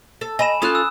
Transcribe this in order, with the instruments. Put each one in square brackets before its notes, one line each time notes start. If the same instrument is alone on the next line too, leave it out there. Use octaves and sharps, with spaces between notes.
[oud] A4
[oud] D#5 [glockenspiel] G#5 B5 E7
[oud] C#4 F4 A4 [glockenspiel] D#6 F#6
[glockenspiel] E6